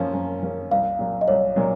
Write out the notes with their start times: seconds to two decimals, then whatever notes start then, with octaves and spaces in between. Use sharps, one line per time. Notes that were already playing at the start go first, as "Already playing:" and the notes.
Already playing: F#2 F3 A#3 C#4 F5
0.13 F#2
0.43 F3 A#3 C#4
0.71 C2 F5
0.99 A#2 F#3
1.21 D#5
1.28 C2 C#5
1.56 A#2 F#3